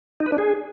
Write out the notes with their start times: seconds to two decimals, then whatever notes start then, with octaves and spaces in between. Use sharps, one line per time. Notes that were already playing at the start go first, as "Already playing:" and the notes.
0.20 D#4
0.26 B4
0.32 D4
0.38 G#4